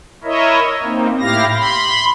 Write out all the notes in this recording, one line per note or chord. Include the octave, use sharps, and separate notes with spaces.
E4 A#4 C#5 D#5 E5
A#3 C4 D#4
A2 E4 G4 F5 A#6
B5 C6